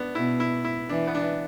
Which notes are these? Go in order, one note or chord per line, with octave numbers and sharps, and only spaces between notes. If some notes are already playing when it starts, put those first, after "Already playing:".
Already playing: B3 D4
B2 E4
E4
E4
E3 D4
B3
D4